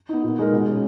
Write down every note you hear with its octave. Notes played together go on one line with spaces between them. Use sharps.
B3 D#4
A#2
G#3 D#4 A#4
B2
G#3 C#4